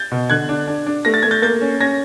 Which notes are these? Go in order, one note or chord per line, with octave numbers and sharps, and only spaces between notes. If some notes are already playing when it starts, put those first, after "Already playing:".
Already playing: G6 A6
B2
D3 F#6 G#6
D4
D4
D4
A3 A#6
A6
A3 G#6
G6 A6
A#3 G6 A6
C#4
C#4 G#6 A#6